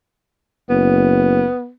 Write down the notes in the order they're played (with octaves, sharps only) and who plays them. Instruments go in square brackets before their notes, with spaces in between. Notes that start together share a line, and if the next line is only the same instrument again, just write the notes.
[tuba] F#1 [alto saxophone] B3